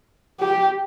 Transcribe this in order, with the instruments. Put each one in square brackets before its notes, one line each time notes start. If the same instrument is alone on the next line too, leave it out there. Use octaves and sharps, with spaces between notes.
[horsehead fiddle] G4